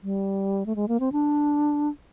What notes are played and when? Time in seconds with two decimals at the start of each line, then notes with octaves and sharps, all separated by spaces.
0.03 G3
0.66 A3
0.76 G#3
0.88 A#3
1.00 C4
1.12 D4